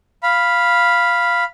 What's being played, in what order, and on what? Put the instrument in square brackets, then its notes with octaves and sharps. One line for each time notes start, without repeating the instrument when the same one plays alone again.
[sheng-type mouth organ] F5 B5